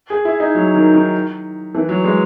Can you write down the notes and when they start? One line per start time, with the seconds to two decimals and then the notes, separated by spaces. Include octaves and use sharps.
0.10 G#4
0.25 E4
0.40 D#4
0.55 F#3
0.74 D#3
0.94 D#3
1.75 E3
1.89 F#3
2.04 G#3